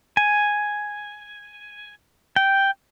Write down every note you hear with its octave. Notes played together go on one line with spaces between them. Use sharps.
G#5
G5